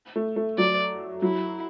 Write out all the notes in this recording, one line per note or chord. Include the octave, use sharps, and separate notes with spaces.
A3
A3
F#3 D5
F#3 E4